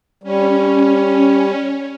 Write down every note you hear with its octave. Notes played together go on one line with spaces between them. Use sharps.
G3 C#4